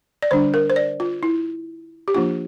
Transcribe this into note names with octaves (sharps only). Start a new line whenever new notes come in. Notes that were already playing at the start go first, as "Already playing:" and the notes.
D5
D3 G3 D4 C5
A#4
C5
D5
F4
E4
G4
F3 A#3 D4 F4